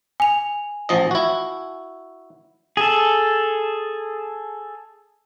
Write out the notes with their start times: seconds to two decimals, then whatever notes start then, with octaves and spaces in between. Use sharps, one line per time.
0.20 G#5 F7
0.89 A1 F3 D#5
1.11 E4 F#4
2.77 G#4 A4